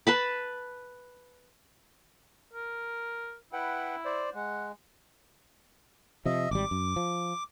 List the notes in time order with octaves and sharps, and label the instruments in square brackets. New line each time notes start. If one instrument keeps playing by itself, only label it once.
[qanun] B4 A5 B5
[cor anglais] A#4
[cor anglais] E4 [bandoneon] B4 F#5 G5
[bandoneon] C5 D5
[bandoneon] G#3 [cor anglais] F#5
[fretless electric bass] C3 F3 [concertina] D#5 E5
[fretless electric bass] G#1 G3 [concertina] D6
[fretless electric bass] F#2
F3